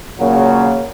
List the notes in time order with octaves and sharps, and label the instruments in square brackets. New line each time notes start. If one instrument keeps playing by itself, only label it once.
[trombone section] A#2 C#3 F#3 A#3